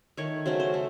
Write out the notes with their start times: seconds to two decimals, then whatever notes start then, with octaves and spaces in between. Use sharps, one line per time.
0.17 D#3 A3 C#5
0.46 C#3 F#3 A3 C5
0.60 C5
0.74 A3